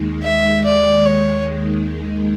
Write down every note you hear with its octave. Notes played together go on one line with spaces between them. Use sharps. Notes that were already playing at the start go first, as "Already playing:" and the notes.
Already playing: D#2 D#3 G#3
E5
D5
C#5